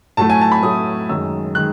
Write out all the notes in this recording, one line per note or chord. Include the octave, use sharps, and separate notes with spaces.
A2 F#3 A3 A5
G#5
A5
B5
A2 F#3 A3 D#6
F#2 D#3 G#3 E6
D#3 G#3 F#6